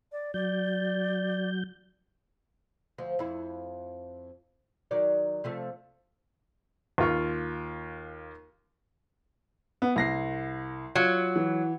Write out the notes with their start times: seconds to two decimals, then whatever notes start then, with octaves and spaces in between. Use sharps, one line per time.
0.12 D5
0.34 F#3 D5 G6
2.98 D2 F3
3.19 F2 E4
4.91 D#3 F#3 D5
5.44 C3 F3 A3
6.98 D#2 F4 C#6
9.82 B3
9.96 C2 A#6 C7
10.95 F#3 F4
11.36 E3